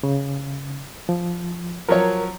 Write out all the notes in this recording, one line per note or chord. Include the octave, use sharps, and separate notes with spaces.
C#3
F3
F3 F#3 A#4 C#5